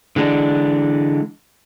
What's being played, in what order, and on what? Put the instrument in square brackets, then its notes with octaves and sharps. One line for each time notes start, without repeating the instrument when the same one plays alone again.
[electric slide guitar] D3 E3 G#3 D4